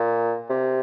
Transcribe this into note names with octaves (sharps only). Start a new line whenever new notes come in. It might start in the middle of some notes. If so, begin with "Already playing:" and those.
Already playing: A#2
C3